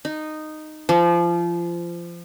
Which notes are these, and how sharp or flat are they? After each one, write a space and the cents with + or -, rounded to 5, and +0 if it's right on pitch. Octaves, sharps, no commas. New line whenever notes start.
D#4 -10
F3 -25